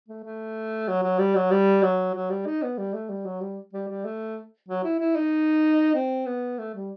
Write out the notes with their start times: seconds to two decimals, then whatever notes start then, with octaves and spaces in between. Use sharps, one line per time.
0.08 A3
0.24 A3
0.88 F#3
1.03 F#3
1.19 G3
1.35 F#3
1.51 G3
1.83 F#3
2.14 F#3
2.30 G3
2.46 D#4
2.62 B3
2.78 G3
2.94 A3
3.09 G3
3.25 F#3
3.41 G3
3.73 G3
3.89 G3
4.05 A3
4.68 F#3
4.84 E4
5.00 E4
5.16 D#4
5.95 C4
6.26 B3
6.59 A3
6.74 G3